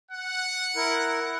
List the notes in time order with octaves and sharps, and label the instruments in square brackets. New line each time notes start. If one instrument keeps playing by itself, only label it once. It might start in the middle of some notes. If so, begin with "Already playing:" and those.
[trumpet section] F#5
[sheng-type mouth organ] E4 A#4